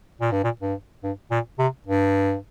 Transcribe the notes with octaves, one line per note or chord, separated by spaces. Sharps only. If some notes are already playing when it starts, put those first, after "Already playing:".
A#2
G2
A#2
G2
G2
A#2
C3
G2